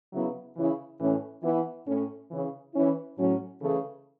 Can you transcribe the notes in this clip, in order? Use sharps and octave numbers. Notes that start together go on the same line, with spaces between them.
C#3 F#3 B3 E4
C#3 E3 C#4 E4
A2 E3 A3 C#4
E3 B3 E4
A2 A3 C#4
C#3 E3 C#4 E4
E3 C#4 E4
A2 F#3 C#4
C#3 E3 A3